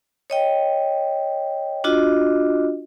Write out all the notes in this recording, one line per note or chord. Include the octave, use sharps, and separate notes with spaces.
C#5 D#5 G5
D4 F4 F#4 D#5